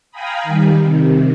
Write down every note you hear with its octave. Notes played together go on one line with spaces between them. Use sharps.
F5 G5 G#5 A#5 B5 D#6
D#3 G3
C3 D#3